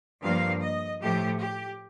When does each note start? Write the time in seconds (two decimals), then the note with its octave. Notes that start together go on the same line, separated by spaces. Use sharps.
0.22 G2 F3 A#3 F5
0.61 D#5
0.99 A2 F3 A3 G4
1.38 G4